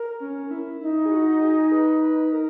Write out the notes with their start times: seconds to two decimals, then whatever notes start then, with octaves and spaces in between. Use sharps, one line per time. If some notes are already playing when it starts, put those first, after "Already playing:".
Already playing: A#4
0.20 C#4
0.51 E4
0.81 D#4 E4
1.05 G#4
1.11 F#4
1.41 G#4
1.71 B4
2.01 B4
2.32 A#4